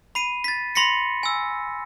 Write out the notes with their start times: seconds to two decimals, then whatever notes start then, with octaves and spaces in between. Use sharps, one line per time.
0.15 B5 C7 D#7
0.44 A6 B6
0.75 B5 C6 A#6 B6 C#7
1.23 G#5 E6